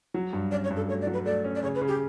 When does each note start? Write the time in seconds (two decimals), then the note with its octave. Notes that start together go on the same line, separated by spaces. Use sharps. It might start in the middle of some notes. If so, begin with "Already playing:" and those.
0.14 F#3
0.33 G2
0.51 C#4 D5
0.64 C#5
0.71 G2
0.76 A4
0.89 A3 C#5
1.02 D5
1.07 F#3
1.13 B4
1.25 A3 D5
1.44 C#4
1.55 D5
1.63 C#3 C#5
1.75 B4
1.82 C#3
1.88 G4